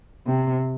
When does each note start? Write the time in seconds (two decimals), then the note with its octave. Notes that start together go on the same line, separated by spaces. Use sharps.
0.27 C3